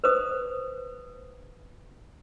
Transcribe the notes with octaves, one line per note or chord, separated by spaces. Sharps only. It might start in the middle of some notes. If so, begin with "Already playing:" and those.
B4 C5 D#6